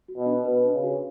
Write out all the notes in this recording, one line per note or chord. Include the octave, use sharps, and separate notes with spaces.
F#4
B2
D4
B2 B4
D4
C#3
F#4